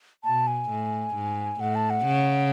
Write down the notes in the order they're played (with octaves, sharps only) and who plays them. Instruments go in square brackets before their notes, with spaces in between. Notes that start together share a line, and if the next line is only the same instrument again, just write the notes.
[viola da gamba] B2 [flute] A5
[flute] G#5
[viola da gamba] A2
G#2
[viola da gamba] A2 [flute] F#5
[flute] A5
F#5
[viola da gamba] C#3